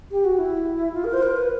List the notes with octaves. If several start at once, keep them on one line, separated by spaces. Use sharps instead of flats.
G4
F#4
E4
F4
A#4
C5
A#4
B4